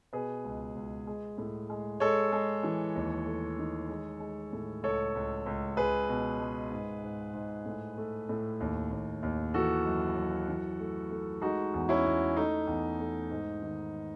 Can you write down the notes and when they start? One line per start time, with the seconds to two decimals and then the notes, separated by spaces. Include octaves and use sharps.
0.13 B2 G#4 B4
0.44 C#2
0.76 C#2
1.07 G#3
1.38 A2
1.70 G#3
2.00 G#3 A4 C#5
2.32 G#3
2.63 E3
2.95 D#2
3.27 A3
3.58 D#3
3.89 G#3
4.20 G#3
4.53 A2
4.83 C#2 A4 C#5
5.15 C#2
5.46 C#2
5.77 C#2 G#4 B4
6.09 B2
6.40 G#3
6.71 G#2
7.03 G#2
7.34 G#2
7.65 A2
7.97 A3
8.29 A2
8.60 D#2
8.91 D#2
9.23 D#2
9.54 E3 F#4 A4
9.86 F#2
10.16 F#2
10.48 E3
10.80 A3
11.11 A3
11.42 G#3 D#4 F#4
11.74 E2
11.89 C#4 E4
12.06 E2
12.37 A3 D#4
12.67 E2
12.99 A3
13.30 G#2
13.62 D#3